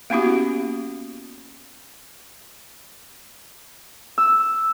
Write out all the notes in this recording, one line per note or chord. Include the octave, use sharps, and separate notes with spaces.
A#3 B3 C#4 E4 F#4 G4
E6